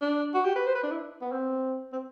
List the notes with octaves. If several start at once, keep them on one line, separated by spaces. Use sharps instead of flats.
D4
F#4
G4
B4
C5
B4
D4
E4
B3
C4
C4